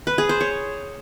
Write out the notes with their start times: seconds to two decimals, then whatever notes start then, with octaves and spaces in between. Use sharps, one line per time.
0.07 B4
0.18 G#4
0.29 C5
0.41 C#5